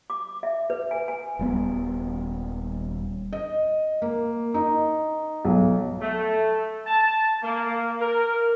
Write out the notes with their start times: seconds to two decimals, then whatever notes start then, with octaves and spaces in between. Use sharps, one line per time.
0.10 D6
0.43 E5
0.70 B4
0.91 G#5
1.08 G#5
1.39 D#1 G3 B3
3.33 D#5
4.02 A#3
4.54 D#4
5.45 B1
6.01 A3
6.86 A5
7.43 A#3
8.01 A#4